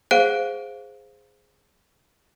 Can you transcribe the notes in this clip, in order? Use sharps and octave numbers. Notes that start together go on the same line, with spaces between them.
G#4 C5 F5 F#5 F#6 D7